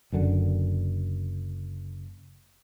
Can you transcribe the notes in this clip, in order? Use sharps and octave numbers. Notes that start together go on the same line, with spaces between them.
F#1 F#2 D3